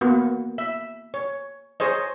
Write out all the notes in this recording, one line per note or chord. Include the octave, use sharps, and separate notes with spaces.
A#3 B3 F#4
E5
C#5
G#4 C5 C#5 D#5